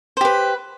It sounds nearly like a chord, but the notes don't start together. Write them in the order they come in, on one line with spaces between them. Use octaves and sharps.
C5 G4 B4